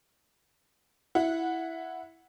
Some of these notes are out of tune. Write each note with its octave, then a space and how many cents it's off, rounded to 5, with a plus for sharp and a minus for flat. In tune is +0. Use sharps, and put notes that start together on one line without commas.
E4 +0 F#5 -15